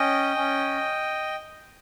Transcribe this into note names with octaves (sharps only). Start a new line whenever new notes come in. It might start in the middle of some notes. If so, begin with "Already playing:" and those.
Already playing: C#4 D#5 G5
C#4